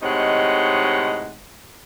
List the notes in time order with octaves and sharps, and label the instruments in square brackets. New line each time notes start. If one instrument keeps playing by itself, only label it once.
[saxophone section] A2 C3 G#3 D#4 C#5 F#5